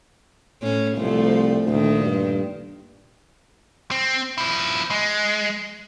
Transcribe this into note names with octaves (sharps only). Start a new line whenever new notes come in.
A2 C#4
C2 F3 A3
D2 A#2 D#3
G2
C4
F3 E4
G#3